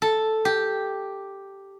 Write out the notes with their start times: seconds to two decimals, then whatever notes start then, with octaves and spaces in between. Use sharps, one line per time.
0.02 A4
0.45 G4